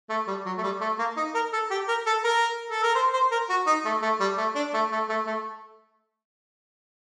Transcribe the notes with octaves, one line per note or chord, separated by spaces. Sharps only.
A3
G3
F#3
A3
G3
A3
A#3
D#4
A#4
A4
G4
A#4
A4
A#4
A4
A#4
C5
C5
A#4
F#4
D#4
A3
A3
G3
A3
D4
A3
A3
A3
A3